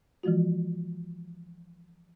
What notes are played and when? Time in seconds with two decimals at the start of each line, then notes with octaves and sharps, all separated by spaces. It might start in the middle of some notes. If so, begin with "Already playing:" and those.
0.23 E3 F3 G#3 F4 F#4